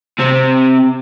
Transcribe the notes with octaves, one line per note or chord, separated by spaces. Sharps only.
C3 C4